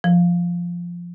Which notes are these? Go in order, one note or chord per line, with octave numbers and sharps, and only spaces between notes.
F3